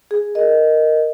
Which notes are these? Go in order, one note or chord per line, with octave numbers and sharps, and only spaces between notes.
G#4
A#4 D#5